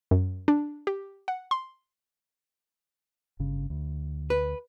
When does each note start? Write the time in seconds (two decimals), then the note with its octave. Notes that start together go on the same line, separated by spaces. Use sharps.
0.11 F#2
0.48 D4
0.87 G4
1.28 F#5
1.51 C6
3.39 G1 C#3
3.70 D2
4.30 B4